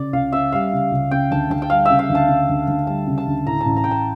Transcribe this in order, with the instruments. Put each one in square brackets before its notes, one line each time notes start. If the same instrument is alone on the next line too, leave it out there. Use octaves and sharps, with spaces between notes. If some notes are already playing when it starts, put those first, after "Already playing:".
Already playing: [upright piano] C#3 [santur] D5
[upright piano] C#2 [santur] F5
[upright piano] C#4 [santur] E5
[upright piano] G3 [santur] F5
[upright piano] C#3
C#2
[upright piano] C#3 [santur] G5
[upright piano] D2 [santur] A5
[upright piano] D2 [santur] A5
[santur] G5
[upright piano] G3 [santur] F5
[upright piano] C#3 [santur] E5
[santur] F5
[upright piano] D2
[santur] A5
[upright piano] C#3
D2
D2
[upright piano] G3 [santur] A5
[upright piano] C#3
[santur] A5
[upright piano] D2
[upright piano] A2 [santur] A#5
[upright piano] A1 [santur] A5
[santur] A#5
[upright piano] A1 [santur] G5
[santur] A5